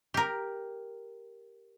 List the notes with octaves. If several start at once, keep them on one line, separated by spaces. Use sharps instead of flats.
G4 A#4